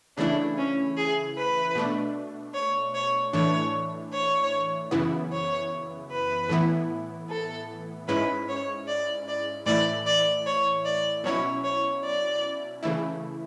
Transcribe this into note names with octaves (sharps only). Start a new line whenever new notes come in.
C#3 E3 A3 D4 E4
C#4
G#4
B4
B2 A3 D4
C#5
C#5
A2 E3 A3 D4 C#5
C#5
F#2 C#3 E3 B3 E4
C#5
B4
A2 E3 B3 E4
A4
G#2 G#3 C#4 E4 B4
C#5
D5
D5
A2 E3 A3 E4 D5
D5
C#5
D5
B2 F#3 C#4 E4 C#5
C#5
D5
C#3 E3 A3 E4